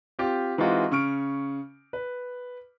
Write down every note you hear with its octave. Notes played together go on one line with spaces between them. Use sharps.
C4 F4 G4
E3 G#3 C4 D#4 F4 F#4
C#3 C#6 F6 D7
B4